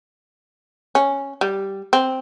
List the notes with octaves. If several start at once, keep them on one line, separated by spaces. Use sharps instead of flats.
C#4
G3
C4